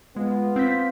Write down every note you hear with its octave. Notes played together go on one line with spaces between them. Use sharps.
G#3 B3 F4
C4 G6 B6